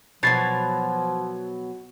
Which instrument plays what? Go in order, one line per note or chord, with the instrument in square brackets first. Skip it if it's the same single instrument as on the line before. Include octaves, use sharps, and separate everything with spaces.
[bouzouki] B2 D3 F#3 [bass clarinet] F3 [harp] G#6 A6 C7